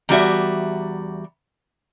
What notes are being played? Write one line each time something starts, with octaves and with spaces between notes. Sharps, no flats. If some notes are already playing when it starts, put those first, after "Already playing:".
E2 G3 F#4 E5